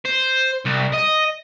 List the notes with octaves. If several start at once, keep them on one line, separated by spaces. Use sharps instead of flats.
C5
C2
D#5